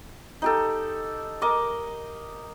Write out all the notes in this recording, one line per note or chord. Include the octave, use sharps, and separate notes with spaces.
D#4 G4 A4
A#4 D#5 D6